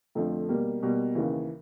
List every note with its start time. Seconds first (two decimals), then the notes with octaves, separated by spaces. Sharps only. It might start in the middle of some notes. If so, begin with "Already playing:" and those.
0.15 F2 D3 F3 A3
0.49 B2 G3 A#3
0.82 B2 G3 A#3
1.15 D#2 C#3 E3